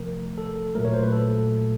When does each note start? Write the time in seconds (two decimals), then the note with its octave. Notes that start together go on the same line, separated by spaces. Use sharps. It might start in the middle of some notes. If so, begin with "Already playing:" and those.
Already playing: C3 F3 A3 A#4
0.38 A4
0.75 A#2 F#3 A3 A#4
0.85 C#5
0.93 C5
1.03 B4
1.12 A4